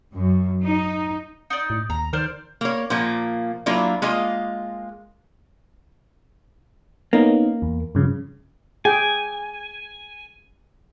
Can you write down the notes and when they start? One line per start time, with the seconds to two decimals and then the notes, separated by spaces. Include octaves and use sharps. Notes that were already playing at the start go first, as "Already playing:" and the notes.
0.14 F#2
0.64 D#4
1.50 D#4 D5
1.70 A2
1.90 D#2 A#5
2.13 D#3 C5 D5 F6
2.61 A#3 C#5
2.90 A#2 F3 A#3
3.66 F#3 A#3 D4 E4 F4
4.02 G#3 A#3 F4 D#5
7.13 A#3 B3 C#4 D#4
7.62 E2
7.95 G2 C#3 F3
8.85 G#4 G5 G#5